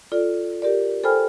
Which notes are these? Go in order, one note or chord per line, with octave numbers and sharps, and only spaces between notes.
F4 A4 D5
G4 A#4 D5
A4 C5 G5 G#5 B5 F6